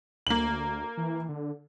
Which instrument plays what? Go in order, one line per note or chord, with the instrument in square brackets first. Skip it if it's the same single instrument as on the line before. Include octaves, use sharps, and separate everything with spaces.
[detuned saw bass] D2 [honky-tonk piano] A#3 F#7
[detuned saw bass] E3
D3